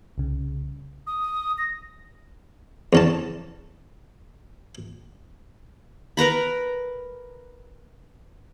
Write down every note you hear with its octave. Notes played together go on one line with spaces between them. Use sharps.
C2 C#3
D#6
A#6
E2 C#4 A5
A#4 B4 A#5 B5